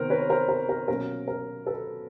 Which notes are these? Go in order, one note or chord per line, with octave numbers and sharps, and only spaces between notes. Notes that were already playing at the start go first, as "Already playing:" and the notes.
Already playing: C3 D#3 B3 A#4 C5
B4 C#5
A#4 C5
A#4
A#4
B2 F#3 A#3 C#4 A#4
A#4
A4 B4